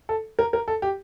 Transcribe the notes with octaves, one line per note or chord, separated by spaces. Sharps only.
A4
A#4
A#4
A4
G4